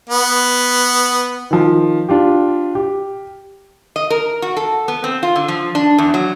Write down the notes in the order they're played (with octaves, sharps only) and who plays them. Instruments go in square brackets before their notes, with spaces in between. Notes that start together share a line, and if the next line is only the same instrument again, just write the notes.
[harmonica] B3
[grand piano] D#3 F3
D4 F4 G4
G4
[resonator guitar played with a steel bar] D#5
A#4
F#4
A4
B3
C4
F4
D3
F3
D4
E2
F#3